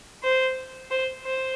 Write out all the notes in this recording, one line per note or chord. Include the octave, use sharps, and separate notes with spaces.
C5
C5
C5